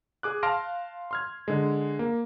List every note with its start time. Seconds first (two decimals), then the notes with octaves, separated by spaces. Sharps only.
0.23 G#4 D6 F#6
0.43 F5 A5 C6 F6 A#6 D7
1.11 C6 F6 G#6
1.48 D3 G#3
1.99 A#3